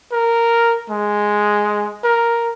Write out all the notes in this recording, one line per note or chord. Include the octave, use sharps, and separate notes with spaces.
A#4
G#3
A#4